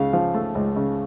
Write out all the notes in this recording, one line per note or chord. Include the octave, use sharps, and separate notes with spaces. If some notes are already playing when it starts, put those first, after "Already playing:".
Already playing: C#2 C#3 F5
F3
A3
C#2
C#3